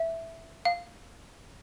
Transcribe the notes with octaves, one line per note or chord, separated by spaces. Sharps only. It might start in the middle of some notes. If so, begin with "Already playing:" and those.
Already playing: E5
F5